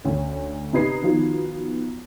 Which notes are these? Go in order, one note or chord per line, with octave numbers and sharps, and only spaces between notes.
D2 C#4
C3 D#4 B4 D#5 G#6 C7
D#3 F3 B3 F4 F#4